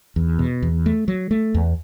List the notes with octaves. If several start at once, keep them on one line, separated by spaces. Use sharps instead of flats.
E2
B2
E2
A3
F#3
A3
E2